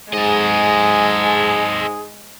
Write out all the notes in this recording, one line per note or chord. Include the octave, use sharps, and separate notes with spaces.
G#2 G#3 G#4 A4 D#5